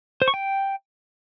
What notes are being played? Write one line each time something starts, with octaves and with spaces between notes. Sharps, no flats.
C5
C#6
G5